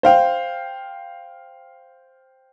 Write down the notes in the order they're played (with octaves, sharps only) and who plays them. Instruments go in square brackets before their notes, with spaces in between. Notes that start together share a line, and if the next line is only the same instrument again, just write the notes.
[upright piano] C5 F5 G5